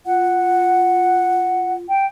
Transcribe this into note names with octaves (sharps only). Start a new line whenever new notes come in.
F4 F#5
G5